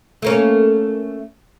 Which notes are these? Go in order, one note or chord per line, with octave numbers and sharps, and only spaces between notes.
A3 A#3 C#4